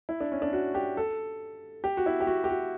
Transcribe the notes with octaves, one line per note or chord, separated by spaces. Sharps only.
E4
D4
C#4
D4
F#4
G4
A4
G4
F#4
E4
G4
F#4
G4
F#4